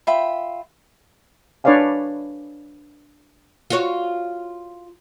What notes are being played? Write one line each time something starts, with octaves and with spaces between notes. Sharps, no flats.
F4 E5 G5 B5
D4 B4 C#5 D5 F5 G#5
F4 F#4 C#5